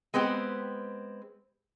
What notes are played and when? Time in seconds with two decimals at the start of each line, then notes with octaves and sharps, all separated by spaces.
0.14 G#3 B3 C4 G4